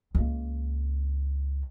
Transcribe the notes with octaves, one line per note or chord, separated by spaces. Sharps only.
C#2 A#3